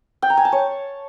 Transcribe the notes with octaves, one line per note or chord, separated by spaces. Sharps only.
G5
A#5
G#5
A5
C#5